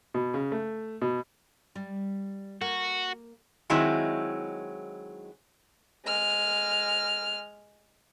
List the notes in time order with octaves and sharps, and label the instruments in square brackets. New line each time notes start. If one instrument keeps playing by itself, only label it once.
[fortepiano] B2
C#3
A3
B2
[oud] G3
[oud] A#3 [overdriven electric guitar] F#4
[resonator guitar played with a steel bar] D#3 F#3 G#3 C4 E4
[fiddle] G#3 F6